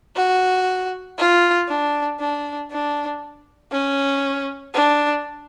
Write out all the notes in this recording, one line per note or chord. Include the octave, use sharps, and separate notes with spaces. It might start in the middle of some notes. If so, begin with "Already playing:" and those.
F#4
F4
D4
D4
D4
C#4
D4